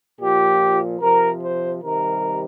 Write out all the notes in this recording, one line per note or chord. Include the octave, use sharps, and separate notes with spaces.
A#2 F3 G4
C3 F3 A#4
C5
C3 D#3 G3 A#4